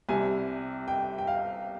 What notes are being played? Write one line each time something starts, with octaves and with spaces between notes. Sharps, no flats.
C2 C3 G3 G#5
G5
G5
F5